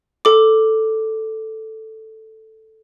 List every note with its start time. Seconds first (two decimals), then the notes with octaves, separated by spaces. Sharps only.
0.25 A4 D6